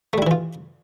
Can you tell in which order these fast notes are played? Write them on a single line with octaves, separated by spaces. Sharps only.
A3 G3 E4 E3 F4